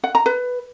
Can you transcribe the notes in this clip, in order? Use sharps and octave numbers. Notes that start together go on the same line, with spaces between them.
F#5
A#5
B4